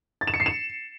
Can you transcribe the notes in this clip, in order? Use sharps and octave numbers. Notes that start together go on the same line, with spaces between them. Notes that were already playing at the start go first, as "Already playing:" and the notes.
A6
E7
C#7
C7
E7